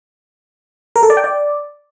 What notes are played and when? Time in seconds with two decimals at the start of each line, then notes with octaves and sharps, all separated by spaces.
0.96 A#4
1.03 A4
1.10 D5
1.17 G5
1.24 D5